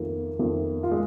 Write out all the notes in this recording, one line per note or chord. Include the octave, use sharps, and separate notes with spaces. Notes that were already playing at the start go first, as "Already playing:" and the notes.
Already playing: F2 D#3 A#3
F2 D#3
F4
G#3